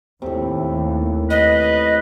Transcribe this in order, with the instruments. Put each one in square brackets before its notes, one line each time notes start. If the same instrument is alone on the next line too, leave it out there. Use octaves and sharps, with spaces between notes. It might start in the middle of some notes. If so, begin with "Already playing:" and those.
[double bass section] D#2 [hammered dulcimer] A2 C3
[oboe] B4 [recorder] D#5